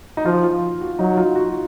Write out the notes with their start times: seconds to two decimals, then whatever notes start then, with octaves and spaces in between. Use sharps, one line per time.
0.17 D#4
0.25 F3 F4
0.44 F4
0.81 F#4
0.99 F#3 D#4
1.17 F4
1.35 F#4